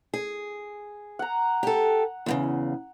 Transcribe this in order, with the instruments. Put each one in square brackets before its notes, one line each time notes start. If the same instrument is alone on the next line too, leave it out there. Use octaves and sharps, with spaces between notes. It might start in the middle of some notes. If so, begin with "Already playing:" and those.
[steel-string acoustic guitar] G#4
[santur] F#5 A#5
[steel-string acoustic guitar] G4 A4
E2 A#2 C#3